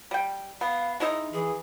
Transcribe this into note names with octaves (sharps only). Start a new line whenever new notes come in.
G3 G5
B3 F5
G#3 D#4 E4 D#5
E3 G#4